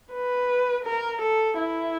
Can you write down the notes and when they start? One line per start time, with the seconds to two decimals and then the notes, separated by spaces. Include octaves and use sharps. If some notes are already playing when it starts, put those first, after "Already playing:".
0.13 B4
0.85 A#4
1.22 A4
1.57 E4